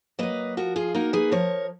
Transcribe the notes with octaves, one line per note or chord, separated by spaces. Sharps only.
F#3 A#3 B4 D#5
F3 F#4 A#4
F4 G#4
A#3 D#4 F#4 A#4
G#4 B4
F3 A#4 C#5